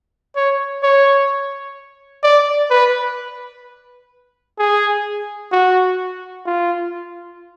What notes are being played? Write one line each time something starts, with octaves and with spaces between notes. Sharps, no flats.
C#5
C#5
D5
B4
G#4
F#4
F4